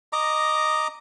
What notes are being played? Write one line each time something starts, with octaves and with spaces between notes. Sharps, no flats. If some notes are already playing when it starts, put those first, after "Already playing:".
D#5 A#5 D6